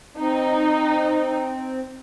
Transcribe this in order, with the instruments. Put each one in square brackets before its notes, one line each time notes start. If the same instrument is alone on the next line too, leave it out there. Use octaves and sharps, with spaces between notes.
[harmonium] C4 [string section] D#4